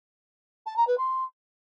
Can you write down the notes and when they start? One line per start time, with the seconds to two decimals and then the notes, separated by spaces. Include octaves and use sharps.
0.66 A5
0.77 A#5
0.87 B4
0.98 C6